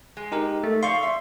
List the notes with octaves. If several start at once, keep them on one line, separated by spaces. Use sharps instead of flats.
G#3
D#4 G4 A#4
A3
F3 D5 F5 C6 C#6
E5